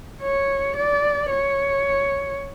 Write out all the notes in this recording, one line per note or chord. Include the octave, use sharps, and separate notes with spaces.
C#5
D5
C#5